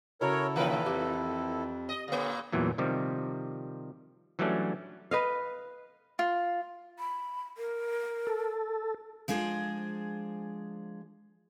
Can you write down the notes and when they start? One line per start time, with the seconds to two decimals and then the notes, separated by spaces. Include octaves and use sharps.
0.21 C#3 E4 F#4 A4 A#4 C#5 A#5
0.56 A#2 D#3 E3 A#4 B4
0.86 F2 G4
1.89 D#5
2.08 A#2 D3 A#3
2.52 E2 G2 A#2 E3 F#3
2.78 C3 D#3 F3 G3
4.39 E3 F#3 G3 A3 C#4 D4
5.11 B4 D#5 F5
6.19 F4
6.99 B5
7.57 A#4
8.27 A4
9.28 F3 G#3 D4 G#4 C5